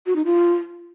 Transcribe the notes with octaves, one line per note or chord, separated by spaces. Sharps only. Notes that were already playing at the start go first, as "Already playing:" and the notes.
F#4
D#4
F4